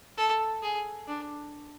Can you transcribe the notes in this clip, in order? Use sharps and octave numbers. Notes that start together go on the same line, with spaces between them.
A4
G#4
D4